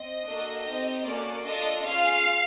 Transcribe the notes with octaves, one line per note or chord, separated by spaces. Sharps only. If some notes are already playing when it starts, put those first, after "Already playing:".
Already playing: C4 D#5
A#3 D4 F#4 A4
C4 D#4 G4
A#3 C#4 F#4 A4 D5
D4 F4 A4 D#5
C#4 F4 G#4 F5